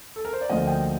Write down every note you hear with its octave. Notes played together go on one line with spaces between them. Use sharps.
A4
A#4
C5
D5
D2 D3 F3 A#3 D#5
G5